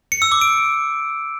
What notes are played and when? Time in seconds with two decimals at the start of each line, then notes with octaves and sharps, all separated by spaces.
0.12 C#7
0.22 E6
0.32 D6
0.41 D7